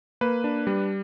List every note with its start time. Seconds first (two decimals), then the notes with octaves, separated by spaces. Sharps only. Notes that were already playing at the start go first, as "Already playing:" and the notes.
0.21 A#3 B4
0.44 D4
0.67 G3